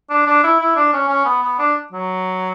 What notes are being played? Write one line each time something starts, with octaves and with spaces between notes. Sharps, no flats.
D4
D4
E4
E4
D4
C#4
C#4
B3
B3
D4
F#3